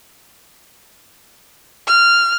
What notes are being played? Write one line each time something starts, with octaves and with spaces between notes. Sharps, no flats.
F6